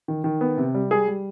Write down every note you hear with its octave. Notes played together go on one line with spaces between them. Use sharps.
D#3
D#3
B3
C3
G3
G3 G#4
G3